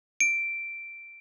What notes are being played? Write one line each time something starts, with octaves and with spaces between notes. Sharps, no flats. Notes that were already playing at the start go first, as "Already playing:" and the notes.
D7